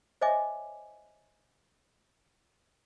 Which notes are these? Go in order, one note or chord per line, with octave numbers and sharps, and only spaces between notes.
C5 C#5 D#5 E5 G#5 D6